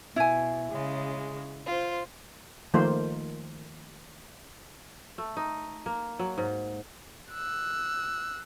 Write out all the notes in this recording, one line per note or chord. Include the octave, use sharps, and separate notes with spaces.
B2 E4 G#5
C#3 G#3
F4 C5
D#3 F3 A3 A#3 F4 C5
A3
D#4
A#3
F#3
G#2
E6 F#6